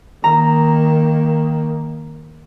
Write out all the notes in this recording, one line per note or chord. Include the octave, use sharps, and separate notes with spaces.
D#3 A#3 A#5